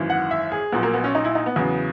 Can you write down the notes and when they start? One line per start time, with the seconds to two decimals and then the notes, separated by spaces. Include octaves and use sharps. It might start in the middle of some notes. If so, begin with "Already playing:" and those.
Already playing: G#1 F#2 E3
0.10 F#5
0.31 E5
0.52 G#4
0.72 A#1 A#2 F#3 B3
0.83 A#3
0.94 B3
1.04 C#4
1.15 D#4
1.25 E4
1.35 D#4
1.46 B3
1.56 E2 C#3 F#3